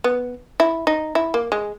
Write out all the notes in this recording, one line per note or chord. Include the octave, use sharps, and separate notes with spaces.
B3
E4
D#4
E4
A#3
G#3